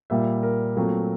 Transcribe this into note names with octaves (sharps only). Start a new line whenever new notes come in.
A#2 G3 A#3 E5
A#4
A#2 F#3 A3 C4